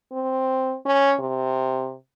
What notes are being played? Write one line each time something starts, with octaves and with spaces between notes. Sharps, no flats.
C4
C#4
C3